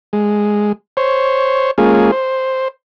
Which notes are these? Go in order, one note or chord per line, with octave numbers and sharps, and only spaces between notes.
G#3
C5 C#5
G#3 A#3 C#4 F4 G#4
C5